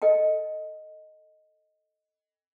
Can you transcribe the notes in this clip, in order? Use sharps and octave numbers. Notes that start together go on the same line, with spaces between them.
A4 D#5 G5 A5